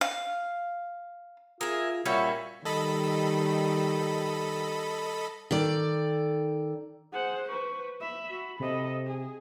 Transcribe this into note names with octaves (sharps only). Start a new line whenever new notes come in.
F5
F4 G#4 A#4 E5
A#2 G3 C#4 F#4 C#5 E5
D#3 G3 A4 D#5 B5
D#3 A4 D5
G#4 C5 F#5
B4 C5 C#6
E5 B5
F#4
C3 A4 D#5
G#4